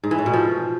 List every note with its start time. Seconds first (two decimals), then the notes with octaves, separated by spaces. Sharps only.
0.04 G#2
0.11 E3
0.19 A2
0.26 B2
0.34 F3